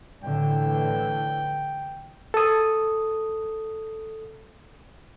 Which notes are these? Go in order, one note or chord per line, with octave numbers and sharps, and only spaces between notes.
A2 D3 E3 G5
A4 D#6